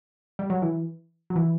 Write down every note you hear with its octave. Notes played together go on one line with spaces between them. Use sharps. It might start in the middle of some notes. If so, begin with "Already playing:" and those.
G3
F#3
E3
F#3
E3